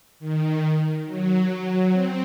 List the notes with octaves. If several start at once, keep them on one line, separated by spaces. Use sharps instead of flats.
D#3
F#3
C4